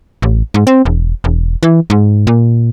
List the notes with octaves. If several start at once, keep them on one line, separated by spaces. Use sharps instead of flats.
A1
G#2
C4
E1
E1
E3
G#2
A#2